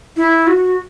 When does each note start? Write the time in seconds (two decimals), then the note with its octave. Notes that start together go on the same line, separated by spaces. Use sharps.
0.17 E4
0.47 F#4